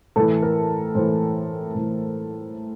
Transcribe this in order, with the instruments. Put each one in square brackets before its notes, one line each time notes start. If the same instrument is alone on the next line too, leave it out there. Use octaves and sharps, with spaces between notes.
[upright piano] A2 E3 A4
A#4
A2 E3 C5
A2 E3